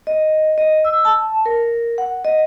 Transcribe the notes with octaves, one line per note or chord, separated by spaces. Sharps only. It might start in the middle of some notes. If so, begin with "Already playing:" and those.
D#5
D#5
E6
A5
A#4
F#5
D#5